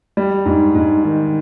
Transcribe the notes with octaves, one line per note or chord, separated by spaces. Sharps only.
G3
G#2
G#2
D#3